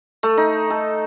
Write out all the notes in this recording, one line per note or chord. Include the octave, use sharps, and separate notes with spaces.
A3
D#4
A4